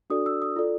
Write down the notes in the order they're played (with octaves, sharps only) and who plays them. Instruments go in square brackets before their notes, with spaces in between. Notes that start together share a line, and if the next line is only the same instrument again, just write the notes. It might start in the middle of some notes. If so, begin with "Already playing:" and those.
[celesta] D4 F#4 A4 D5 D#6
E6
D#6
F4 A4 D5